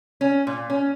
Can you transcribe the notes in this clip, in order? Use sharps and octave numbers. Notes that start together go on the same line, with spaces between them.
C#4
A#2
C#4